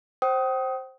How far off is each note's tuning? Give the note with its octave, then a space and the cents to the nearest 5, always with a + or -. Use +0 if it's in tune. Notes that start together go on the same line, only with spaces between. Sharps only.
C5 +10 G5 -35 D#6 +20